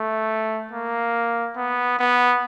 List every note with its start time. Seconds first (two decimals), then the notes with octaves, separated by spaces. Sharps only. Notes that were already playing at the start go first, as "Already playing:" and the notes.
Already playing: A3
0.72 A#3
1.57 B3
1.99 B3